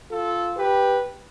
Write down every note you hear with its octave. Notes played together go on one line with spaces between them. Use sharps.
F4 A4
G4 B4